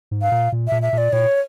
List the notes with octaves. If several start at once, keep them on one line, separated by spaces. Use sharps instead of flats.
G#2
F5
A#2
A#2
A#2 E5
E5
A#2
D5
A#2 C#5